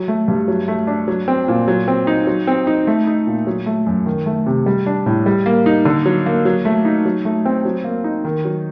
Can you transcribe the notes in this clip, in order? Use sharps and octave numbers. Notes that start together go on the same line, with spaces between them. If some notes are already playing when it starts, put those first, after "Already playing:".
Already playing: F#3
A3
G2
F#3
A3
D4
F#3
C4
A#2
F#3
C4
D#4
F#3
C4
D#4
A3
D#4
A#2
F#3
A3
F#2
D#3
A3
C3
G3
D4
A2
G3
A#3
D#4
D3
F#3
A#3
F#3
A3
D#4
F#3
A3
C4
F#3
A#3
D#4
D#3
F#3